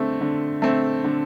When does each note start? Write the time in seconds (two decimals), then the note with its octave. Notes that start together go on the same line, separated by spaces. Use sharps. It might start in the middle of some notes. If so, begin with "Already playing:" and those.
Already playing: D3 A3 C4
0.21 D3
0.62 A3 C4
1.04 D3